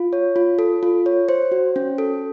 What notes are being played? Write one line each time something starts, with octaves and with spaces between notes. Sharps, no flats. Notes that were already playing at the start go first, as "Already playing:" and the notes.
Already playing: F4
C#5
F4
A4
F4
C#5
C5
F#4
C#4
A4